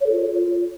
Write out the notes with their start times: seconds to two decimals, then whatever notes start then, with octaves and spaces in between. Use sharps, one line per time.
0.01 C#5
0.06 A4
0.12 F4